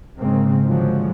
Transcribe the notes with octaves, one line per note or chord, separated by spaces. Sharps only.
G#2 C#3 G#3 A#3 C4
A2 D3 F3 F#3 G#3